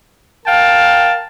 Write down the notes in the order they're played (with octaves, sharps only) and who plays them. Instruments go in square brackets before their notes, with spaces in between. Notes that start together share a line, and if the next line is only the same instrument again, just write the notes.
[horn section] A#4 F5 G5 A5